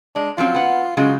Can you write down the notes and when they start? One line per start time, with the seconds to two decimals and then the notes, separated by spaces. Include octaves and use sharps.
0.16 G#3 D4
0.38 F3 F#3 C4 F4
0.55 B3 F#5
0.97 C#3 F#3 G#3 F4